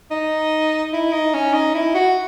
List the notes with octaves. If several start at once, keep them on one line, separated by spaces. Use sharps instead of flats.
D#4
E4
D#4
C#4
D#4
E4
F#4